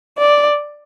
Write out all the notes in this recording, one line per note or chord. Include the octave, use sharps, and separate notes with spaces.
D5